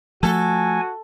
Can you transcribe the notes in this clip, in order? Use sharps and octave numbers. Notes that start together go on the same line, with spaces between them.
F3 A3 F#4 A4 G#5